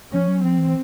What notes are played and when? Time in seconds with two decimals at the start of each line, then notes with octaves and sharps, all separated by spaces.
0.13 F3 C#4
0.28 F#3
0.43 F3 C4
0.59 E3